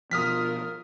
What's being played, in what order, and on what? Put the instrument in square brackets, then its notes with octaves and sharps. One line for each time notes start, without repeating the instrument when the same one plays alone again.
[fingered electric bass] B2 F3 [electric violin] F4 A#4 [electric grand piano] D#6 F6 B6